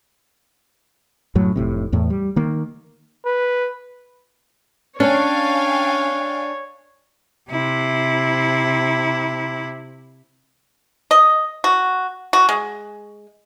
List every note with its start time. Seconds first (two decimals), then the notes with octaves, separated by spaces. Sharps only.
1.35 F#2 A2 F#3
1.56 F1 A2 C3
1.92 E2 A2
2.10 G3
2.36 D#3 A#3
3.26 B4
5.00 C#4 D4 C#5 F5 G5 G#5
7.50 C3 E4
11.11 D#5
11.64 F#4
12.33 F#4
12.49 G#3